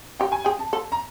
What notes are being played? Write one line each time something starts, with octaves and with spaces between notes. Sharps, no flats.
G4 G5
G#5
G#4 G5
A5
A4
A#5